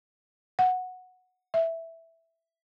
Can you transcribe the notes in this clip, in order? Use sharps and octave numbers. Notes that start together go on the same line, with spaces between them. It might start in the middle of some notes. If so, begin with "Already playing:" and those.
F#5
E5